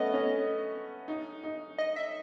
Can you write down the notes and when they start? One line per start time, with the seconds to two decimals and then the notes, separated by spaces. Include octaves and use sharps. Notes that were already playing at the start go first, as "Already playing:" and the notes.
Already playing: A3 B3 C#4 D#5
0.13 C#4
1.08 D#4
1.44 D#4
1.78 D#5
1.96 E5